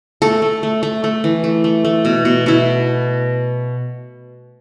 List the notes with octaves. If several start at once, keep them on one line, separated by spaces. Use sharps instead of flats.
A3 A4
A3
A3
A3
A3
E3
A3
A3
A3
B2
B2
B2 E4